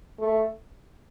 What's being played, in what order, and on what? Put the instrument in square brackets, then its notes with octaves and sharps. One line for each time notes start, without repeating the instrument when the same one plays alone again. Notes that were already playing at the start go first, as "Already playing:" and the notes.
[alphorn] A3